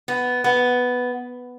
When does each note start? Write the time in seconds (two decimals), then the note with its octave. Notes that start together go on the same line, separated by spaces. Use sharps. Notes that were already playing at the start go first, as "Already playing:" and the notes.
0.08 B3
0.44 B3